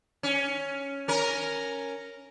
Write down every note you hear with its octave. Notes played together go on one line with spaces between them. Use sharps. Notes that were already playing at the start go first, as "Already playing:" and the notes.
C#4
C#4 A#4